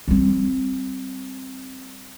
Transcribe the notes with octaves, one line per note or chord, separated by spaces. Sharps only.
G3 C4